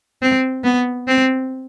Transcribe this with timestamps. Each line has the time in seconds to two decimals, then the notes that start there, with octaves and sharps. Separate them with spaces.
0.22 C4
0.64 B3
1.07 C4